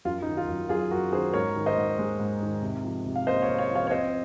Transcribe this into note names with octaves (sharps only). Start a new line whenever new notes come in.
F#2 F4
D#4
D#3
F4
F#2
F#3 F4 G#4
F#2 F#4 A#4
D#3 G#4 C5
G#2 A#4 C#5
D#3
C5 D#5
G#2
G#3
G#2
D#3
C3
F3
C3
F5
A#3 C5 D#5
C#5 F5
C3
C#5 F5
F3
C#5 F5
C#5
C4 C5 D#5